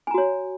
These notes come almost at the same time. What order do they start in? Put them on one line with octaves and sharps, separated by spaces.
G#5 A#5 F#4 C#5